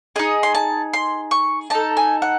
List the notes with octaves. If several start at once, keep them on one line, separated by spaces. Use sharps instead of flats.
D#4 G#4 D#5
C6
A5
C6
C#6
D#4 A4 A5
G#5
F#5